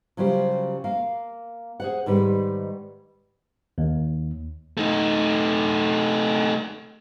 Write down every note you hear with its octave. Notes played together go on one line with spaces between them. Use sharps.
C#3 F#3 G3 F4 G4 C5
A#3 F5
G#4 C5 F#5
G#2 D#3 G3 B4
D#2
A3 D#4